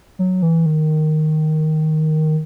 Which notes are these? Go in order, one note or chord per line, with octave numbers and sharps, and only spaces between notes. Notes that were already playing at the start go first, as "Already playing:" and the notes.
F#3
E3
D#3